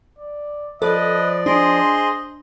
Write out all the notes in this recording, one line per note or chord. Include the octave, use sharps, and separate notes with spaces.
D5
F3 A4 B4 D5 D#5
D4 G#4 C5 D#5 C6